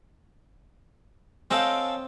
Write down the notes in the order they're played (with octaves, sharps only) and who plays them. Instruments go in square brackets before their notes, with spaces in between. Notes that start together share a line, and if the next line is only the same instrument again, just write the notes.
[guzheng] C4 D#5 G5 [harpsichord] C#4 A4 F5